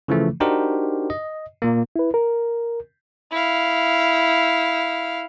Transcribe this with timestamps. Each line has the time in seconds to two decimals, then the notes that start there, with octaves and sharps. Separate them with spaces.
0.08 C#3 E3 F3 A3
0.40 D4 D#4 F#4 G4 A#4 C5
1.10 D#5
1.62 A#2 A#3
1.96 E4 B4
2.14 A#4
3.31 E4 F5